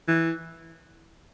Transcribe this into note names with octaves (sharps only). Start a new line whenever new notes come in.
E3